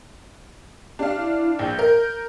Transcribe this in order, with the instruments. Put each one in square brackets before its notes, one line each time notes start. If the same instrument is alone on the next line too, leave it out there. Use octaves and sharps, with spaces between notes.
[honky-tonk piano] D4 F5 [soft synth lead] G4
[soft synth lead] E4
[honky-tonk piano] A#1 [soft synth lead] G6
[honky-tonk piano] A#4